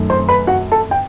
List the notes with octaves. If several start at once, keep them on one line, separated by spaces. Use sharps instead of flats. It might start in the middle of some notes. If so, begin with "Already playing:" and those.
Already playing: F#2 D#3 A3
C5 C6
B4 B5
F#4 F#5
A4 A5
G5